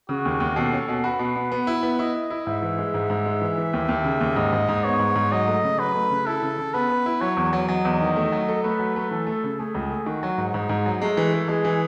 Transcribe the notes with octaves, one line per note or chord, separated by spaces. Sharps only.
C#3 F#4
D#2
D#2
B2 A4
C#4
B2
F#4 B4
B2
B2
B3
E4
B3
E4 D#5
E4
E4
G#2 E5
E3
G#3
G#2
G#2
G#3
E3
E3
D#2
D#2
C#3
D#2
G#2 D#5
G#2
G#2
B3 C#5
G#2
G#2
F#3 D#5
A3
C#3
F#3 B4
A3
C#3
E4 A4
C#3
C#3
B3 B4
B3
E4
F#3 C#5
E2
F#3
F#3 D#5
E2
D#3
A3
F#3
A4
A3 B4
F#3
A3
E3 A4
A3
C#3
A3 G#4
C#2
A3
D#3 F#4
F#3
G#2
G#2 D#4
G#2
F#3
G#3 A3
E3
E3
G#3 G#4
E3